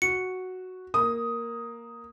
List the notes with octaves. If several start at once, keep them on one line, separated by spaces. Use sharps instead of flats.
F#4 C#7
A#3 D#6